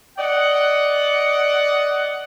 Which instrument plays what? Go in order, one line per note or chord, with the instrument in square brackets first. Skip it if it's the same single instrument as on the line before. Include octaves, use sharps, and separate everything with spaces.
[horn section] D5 D#5 F#5